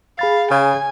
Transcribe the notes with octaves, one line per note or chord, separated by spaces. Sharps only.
G#4 F5 B5 A6
C#3 G#5